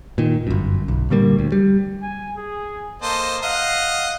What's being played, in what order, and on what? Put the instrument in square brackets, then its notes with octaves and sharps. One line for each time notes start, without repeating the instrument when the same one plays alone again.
[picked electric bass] A#2 D#3
G1 F#2
B1
A#2 D3 G3 A#3
D2
G3
[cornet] G#5
G#4
[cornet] A#3 [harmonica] A4 C5 D#5
[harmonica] D#5 F#5 [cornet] F5